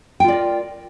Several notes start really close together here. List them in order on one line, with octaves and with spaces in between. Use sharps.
G5 F4 D5 A#4